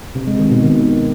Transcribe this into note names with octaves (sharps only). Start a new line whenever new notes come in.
C3
G#3
D#3
B2
D#3